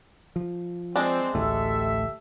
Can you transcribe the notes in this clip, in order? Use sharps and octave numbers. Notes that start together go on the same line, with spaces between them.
F3
G#3 C4 D4
A1 D2 A2 G4 A4 E5